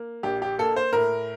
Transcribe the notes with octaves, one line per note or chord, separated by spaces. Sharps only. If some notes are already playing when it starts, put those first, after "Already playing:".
Already playing: A#3
A#1 G4
G4
A#3 A4
C5
A2 A#4